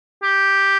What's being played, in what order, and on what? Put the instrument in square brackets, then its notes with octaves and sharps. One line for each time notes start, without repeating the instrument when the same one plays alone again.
[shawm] G4